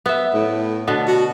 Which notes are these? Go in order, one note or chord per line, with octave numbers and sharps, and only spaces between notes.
B3 E5
A2
B2 D3 B3
F#4